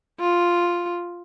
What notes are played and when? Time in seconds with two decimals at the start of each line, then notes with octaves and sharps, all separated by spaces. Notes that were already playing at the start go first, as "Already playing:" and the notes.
0.20 F4